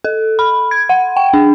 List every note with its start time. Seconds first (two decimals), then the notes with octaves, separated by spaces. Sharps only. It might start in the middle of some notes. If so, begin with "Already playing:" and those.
0.04 A4
0.39 B5
0.71 G#6
0.89 F#5
1.17 G5
1.33 D4